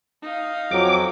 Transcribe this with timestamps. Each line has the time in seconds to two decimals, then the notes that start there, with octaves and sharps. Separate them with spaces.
0.23 D#4 F5
0.71 F2 F#3 D6